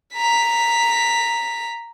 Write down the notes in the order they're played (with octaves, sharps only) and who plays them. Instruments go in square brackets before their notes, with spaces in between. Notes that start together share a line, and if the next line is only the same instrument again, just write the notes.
[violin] A#5 B6